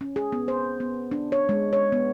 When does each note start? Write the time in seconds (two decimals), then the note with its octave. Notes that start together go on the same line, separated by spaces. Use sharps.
0.01 C#4
0.16 G#4
0.32 B3
0.48 C5
0.80 B3
1.11 D4
1.32 C#5
1.49 G#3
1.73 C#5
1.92 B3